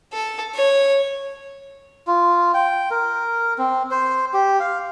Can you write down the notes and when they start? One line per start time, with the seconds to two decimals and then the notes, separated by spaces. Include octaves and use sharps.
0.13 A4
0.54 C#5
2.07 F4
2.54 G5
2.91 A#4
3.58 C4
3.91 C5
4.33 G4
4.60 F5